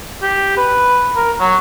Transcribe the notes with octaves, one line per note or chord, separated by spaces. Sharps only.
G4
B4
A#4
F#3